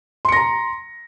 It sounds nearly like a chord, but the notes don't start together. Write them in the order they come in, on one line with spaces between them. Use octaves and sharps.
C6 C#7 A#6 A#5